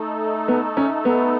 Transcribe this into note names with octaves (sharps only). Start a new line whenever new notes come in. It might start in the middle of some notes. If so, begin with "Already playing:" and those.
Already playing: A3 D#4 A4
B3
C#4
B3